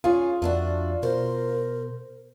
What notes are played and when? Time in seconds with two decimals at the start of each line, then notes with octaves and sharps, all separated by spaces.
0.04 C#4 F4 G#4
0.42 F2 A3 D4 F#4
1.03 B2 A#4 C5